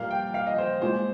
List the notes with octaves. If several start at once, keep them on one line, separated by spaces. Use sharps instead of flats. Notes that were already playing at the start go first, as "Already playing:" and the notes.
Already playing: A#2 G3 A#3 F5
G5
F5
D#5
C5
A#2 G#3 C5